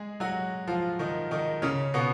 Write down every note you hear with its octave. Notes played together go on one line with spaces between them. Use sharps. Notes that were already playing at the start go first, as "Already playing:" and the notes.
Already playing: G#3 G#4
F#3 F#4
F3 F4
D#3 D#4
D#3 D#4
C#3 C#4
B2 B3